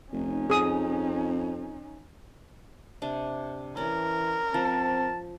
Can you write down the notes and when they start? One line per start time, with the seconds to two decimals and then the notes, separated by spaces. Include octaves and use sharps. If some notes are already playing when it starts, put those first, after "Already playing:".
0.12 F1 C#4 D#4
0.50 F2 G#4 D#6
3.02 C3 D4
3.77 E3 C#4 A#4 D5
4.54 F3 C4 A5